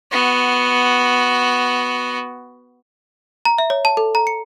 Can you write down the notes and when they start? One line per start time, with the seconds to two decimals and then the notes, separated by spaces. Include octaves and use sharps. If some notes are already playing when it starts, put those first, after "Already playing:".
0.12 B3 F#4
3.45 A#5
3.58 E5
3.70 C#5
3.85 A5
3.97 A4
4.15 A#5
4.27 C#7